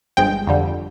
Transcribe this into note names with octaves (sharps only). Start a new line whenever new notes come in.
G1 G2 F3 G#3 G5
F2 D3 G3